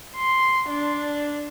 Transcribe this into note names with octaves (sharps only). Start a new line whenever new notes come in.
C6
D4